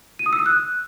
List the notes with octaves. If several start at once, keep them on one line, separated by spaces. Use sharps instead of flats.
D#7
D#6
E6
D#6
F#6